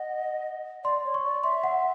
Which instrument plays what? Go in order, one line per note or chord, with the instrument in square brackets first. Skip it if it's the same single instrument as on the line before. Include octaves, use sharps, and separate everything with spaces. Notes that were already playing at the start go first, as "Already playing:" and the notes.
Already playing: [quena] D#5 [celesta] F#5
[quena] D5 [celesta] C6
[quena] C#5
[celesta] C#6
[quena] D5
[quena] E5 [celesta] C6
[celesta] F#5